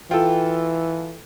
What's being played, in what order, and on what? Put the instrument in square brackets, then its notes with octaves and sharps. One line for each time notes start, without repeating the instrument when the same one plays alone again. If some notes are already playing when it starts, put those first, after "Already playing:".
[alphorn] E3 [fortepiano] F4 A4 [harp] G5